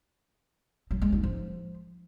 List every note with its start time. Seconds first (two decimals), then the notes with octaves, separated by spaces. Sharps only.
0.91 F#3
1.02 G#3
1.12 D#4
1.23 F3